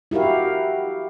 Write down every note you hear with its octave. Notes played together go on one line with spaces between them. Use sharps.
E4 F#4 G4 A#4 F5